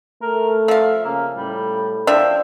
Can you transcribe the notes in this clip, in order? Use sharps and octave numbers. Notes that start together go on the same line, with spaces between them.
A3 A#4
F3 E5 F5
C#3 A#3
A2 G3
F3 D4 E5 G5